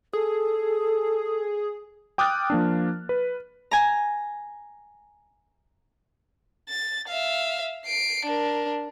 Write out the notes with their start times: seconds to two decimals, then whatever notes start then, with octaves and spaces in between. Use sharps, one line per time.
0.13 G#4 A4
2.18 G5 D6 D#6 F6 F#6 A6
2.50 F3 A#3 D4
3.09 B4
3.71 G#5 A#5
6.69 A6
7.08 E5 F5
7.86 C7 D7
8.26 D4 A#4